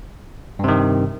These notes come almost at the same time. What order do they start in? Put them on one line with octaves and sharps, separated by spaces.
G2 C3 D#3